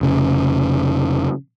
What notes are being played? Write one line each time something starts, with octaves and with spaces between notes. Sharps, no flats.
F1 C#3